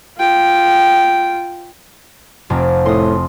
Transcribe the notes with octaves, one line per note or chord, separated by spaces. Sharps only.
F4 G5
F1 F2
A2 C6 D#6